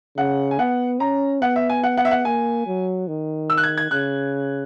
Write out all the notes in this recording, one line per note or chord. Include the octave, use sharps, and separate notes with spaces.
C#3 F#5
G#5
B3 F#5
C#4 A#5
B3 F#5
E5
G#5
F#5
F#5
E5
F#5
A#3 G#5
F#3
D#3
E6
F#6
G#6
G#6
C#3 F#6